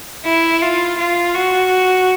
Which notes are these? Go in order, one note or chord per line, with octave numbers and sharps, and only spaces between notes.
E4
F4
F4
F#4